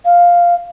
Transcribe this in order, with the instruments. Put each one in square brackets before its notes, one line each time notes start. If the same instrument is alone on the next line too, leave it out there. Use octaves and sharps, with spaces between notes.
[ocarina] F5